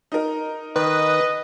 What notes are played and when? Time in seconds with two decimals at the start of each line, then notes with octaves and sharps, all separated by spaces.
0.12 D#4 A#4
0.76 D#3 B4 D#5